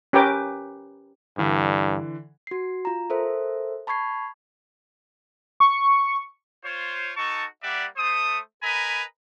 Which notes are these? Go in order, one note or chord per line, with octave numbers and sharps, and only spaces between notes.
C#4 G4 A#4 B4 G5 D6
G2 D3 E3
F#4 C7
F4 A#5
A4 A#4 C5 E5
A5 B5 C#6 G#6 C7
C#6
F4 C5 C#5
D#4 F#4 A4 A5 C#6
G3 A#3 G4 D5 E5 F#5
A3 C5 D#6
A#4 B4 D#5 G#5 A#5 B5